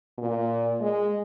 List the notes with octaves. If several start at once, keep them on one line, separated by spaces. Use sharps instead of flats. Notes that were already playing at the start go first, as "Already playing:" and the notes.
A#2
G#3